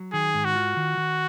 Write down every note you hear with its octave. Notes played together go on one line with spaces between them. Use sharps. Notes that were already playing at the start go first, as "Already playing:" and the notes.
Already playing: F#3
D#3 G#4
G#2
F#4
F4
D#3
D#3